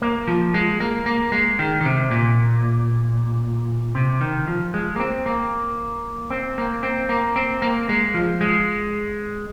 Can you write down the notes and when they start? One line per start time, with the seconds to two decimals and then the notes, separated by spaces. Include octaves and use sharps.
0.02 A#3
0.28 F3
0.54 G#3
0.80 A#3
1.06 A#3
1.32 G#3
1.59 D#3
1.81 D#3
1.85 C3
2.11 A#2
3.95 C3
4.21 D#3
4.48 F3
4.74 G#3
4.96 A#3
5.00 C4
5.26 A#3
6.30 C4
6.58 A#3
6.83 C4
7.09 A#3
7.36 C4
7.62 A#3
7.89 G#3
8.14 F3
8.41 G#3